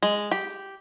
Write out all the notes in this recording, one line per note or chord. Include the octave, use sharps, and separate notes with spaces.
G#3
G4